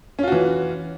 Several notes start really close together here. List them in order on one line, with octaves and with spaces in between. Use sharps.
C#4 F4 F#4 E3